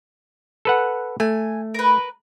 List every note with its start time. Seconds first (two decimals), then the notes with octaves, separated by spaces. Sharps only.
0.65 A4 B4 F#5
1.20 A3 G#5
1.74 A#4 B4